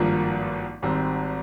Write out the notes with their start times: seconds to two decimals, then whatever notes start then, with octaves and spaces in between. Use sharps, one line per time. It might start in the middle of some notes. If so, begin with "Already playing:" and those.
Already playing: G#1 G2 F3 A#3
0.82 G#1 G#2 G3 C4